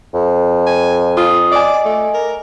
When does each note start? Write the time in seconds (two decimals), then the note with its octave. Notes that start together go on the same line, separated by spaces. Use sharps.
0.14 F2
0.66 G#5
1.17 F4 C6 D#6
1.52 D5 D#5 G#5
1.85 A3
2.14 A#4